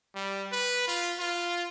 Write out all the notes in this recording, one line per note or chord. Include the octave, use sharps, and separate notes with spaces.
G3
B4
F4
F4